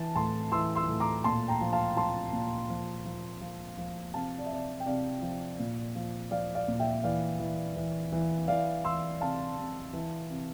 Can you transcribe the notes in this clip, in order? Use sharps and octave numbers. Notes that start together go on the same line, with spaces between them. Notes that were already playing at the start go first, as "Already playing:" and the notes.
Already playing: E3 A5
A2 A5 C6
E3 C6 E6
C6 E6
A2
A#5 D6
A#2 A5 C6
G5 A#5
F3
F5 A5
F3 A5 C6
A#2
F3
F3
F3
F3
C3 F5 A5
D5
E5
C3 D5
G5
C3 D5 F5
F3
A#2
F3
F3 D5 F5
D5 F5
A#2
E5 G5
E3 D5 F5
E3
E3
E3
E3 D5 F5
E3 C6 E6
C3 F5 A5
C3
E3
C3